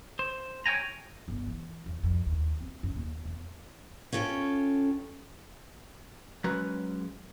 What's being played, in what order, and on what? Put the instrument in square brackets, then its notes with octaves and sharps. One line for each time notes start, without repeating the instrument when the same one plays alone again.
[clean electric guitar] C5
C#5 F5 G5 G#5 A#5
[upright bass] G1
E3
E2
F2
D#2
C4
F#2
D#2
E2
[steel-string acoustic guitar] C#4 F4 A4 G5
[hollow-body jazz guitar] F#3 G#3 C#4 B4 A#5